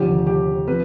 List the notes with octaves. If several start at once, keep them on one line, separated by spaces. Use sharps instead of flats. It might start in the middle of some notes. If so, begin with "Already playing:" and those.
Already playing: F1 D#2 D3 F3 G4
G4
F3 C4 B4